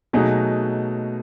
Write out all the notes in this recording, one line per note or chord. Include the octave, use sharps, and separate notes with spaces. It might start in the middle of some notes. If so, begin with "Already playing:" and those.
B2 F#3 A3 D#4 G#4